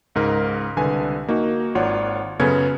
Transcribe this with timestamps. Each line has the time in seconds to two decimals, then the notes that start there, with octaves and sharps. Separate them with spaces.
0.15 C#2 G#2 A#4
0.77 C2 D3 B4 G#5
1.28 A#3 D#4 F#4
1.75 G#1 F4 C#5 D5 F#5
2.40 F#2 C#3 B3 C#4 A4 G#6